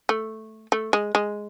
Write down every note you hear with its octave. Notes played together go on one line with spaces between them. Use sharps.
A3
A3
G#3
G#3